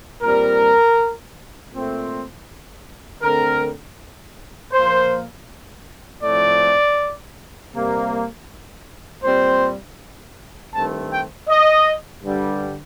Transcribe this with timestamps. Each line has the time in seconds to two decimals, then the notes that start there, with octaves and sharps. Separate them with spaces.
0.21 A#2 G3 C4 A#4
1.72 A#2 A3 C4
3.22 D3 A3 C4 A#4
4.72 A#2 F3 A#3 C5
6.22 A2 F3 A3 C4 D5
7.73 C3 G3 A#3
9.23 A#2 G3 C4 C5
10.73 G2 D#3 A3 C4 A5
11.11 G5
11.48 D#5
12.24 G2 D3 G3